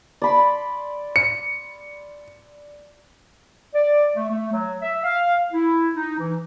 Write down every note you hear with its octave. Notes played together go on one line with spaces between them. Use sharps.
D5 B5 C6
C#7
D5
A3
A3
F#3
E5
F5
E4
D#4
E3